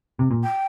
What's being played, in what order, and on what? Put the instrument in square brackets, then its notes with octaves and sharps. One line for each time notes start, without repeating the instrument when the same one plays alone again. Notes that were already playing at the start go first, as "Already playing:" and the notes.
[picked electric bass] C3
A#2
[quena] G5